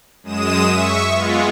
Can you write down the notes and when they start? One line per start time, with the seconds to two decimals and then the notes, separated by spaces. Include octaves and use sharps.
0.23 F#2 G#3 D#6 E7
0.70 E5 C#6
1.13 G#3 B3 F4